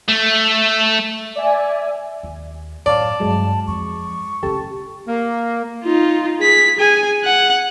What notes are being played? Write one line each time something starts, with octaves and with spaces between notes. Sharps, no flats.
A3
D5 E5 G#5
D#2
F#2 A2 C#5 D5 F5 A5
G2 C3 F#3 G#3
F2 C#6
C#3 A3 G4 A4 A5
A#3
D#4 F4
G#4 B6
G#4 G#5
F#5